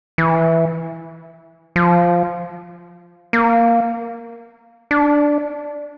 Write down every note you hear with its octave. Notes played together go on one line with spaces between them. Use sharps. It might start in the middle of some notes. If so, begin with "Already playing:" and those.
E3
F3
A#3
D4